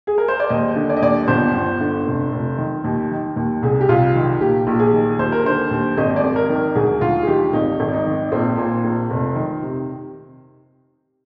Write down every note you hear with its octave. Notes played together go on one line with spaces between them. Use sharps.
G#4
A#4
C5
D5
D#2 D#5
D3
D5
D#5
D#2 D5
G1 C5
G1
D3
F1
F1
D#3
D#2
D#3
D#2
C2 G#4
G4
C2 F4
D#3
A#1 G4
A#1
G#4
D#3
D#2 C5
A#4
D3 C5
D#2
G#1 D#5
D5
G#1
A#4
D#3
A#4
D2 G#4
D2 F4
G#4
D#3 G4
G#1 D#4
G#1
D#4
D#3
A#1 C4
A#2
A#1
F1
D#3
C3